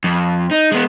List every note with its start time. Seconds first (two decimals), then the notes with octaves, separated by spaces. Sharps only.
0.04 F2
0.51 D#4
0.72 G#3 B3